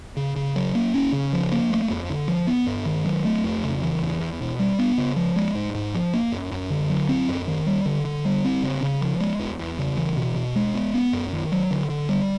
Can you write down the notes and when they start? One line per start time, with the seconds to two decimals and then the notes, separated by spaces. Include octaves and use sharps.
0.16 C#3
0.36 C#3
0.56 F#3
0.75 A#3
0.94 C#4
1.12 C#3
1.33 F3
1.52 A#3
1.70 A3
1.90 F2
2.10 D3
2.28 F3
2.47 B3
2.67 G2
2.85 D#3
3.05 F#3
3.24 A3
3.44 F2
3.64 C#3
3.82 E3
4.02 E2
4.20 E2
4.41 B2
4.59 G3
4.79 B3
4.98 C#3
5.16 F3
5.36 G#3
5.55 G#2
5.75 G#2
5.94 F3
6.14 A#3
6.32 F#2
6.52 F#2
6.70 D3
6.89 F#3
7.09 C4
7.28 F#2
7.48 D#3
7.66 G3
7.86 D3
8.05 D3
8.25 G3
8.44 C4
8.63 C#3
8.83 C#3
9.01 F3
9.21 G#3
9.39 E2
9.59 E2
9.79 C#3
9.97 E3
10.17 B2
10.36 B2
10.56 G#3
10.75 B3
10.94 B3
11.13 F#2
11.32 D#3
11.52 F#3
11.71 D3
11.89 D3
12.09 G3